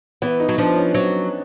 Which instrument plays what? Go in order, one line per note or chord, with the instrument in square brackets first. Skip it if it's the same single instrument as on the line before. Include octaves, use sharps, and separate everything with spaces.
[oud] E3 [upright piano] B3
[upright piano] D#4
[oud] F#3
[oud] F3 [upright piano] D4
[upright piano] C#4
[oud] F#3 [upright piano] C#4